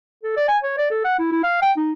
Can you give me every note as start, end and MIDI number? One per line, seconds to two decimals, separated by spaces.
0.23 0.34 69
0.37 0.44 74
0.48 0.58 80
0.63 0.74 73
0.78 0.87 74
0.90 1.03 69
1.04 1.18 78
1.19 1.31 64
1.32 1.43 64
1.44 1.59 77
1.62 1.72 79
1.77 1.92 63